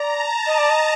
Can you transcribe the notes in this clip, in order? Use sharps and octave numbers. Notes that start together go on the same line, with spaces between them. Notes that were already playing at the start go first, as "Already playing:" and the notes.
Already playing: D5 A#5
A5
D#5
D5
D#5